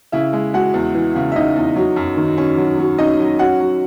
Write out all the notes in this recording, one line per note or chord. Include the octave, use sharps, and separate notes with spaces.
C#3 E4 E5
G#3
G#3 F#4 F#5
E2
E3
C#3
E5
C#3 D#4 D#5
E2
F#3
F#2
D#3
C#4
F#3
F#3
C#4 D#4 D#5
F#3
C#4 F#4 F#5
F#3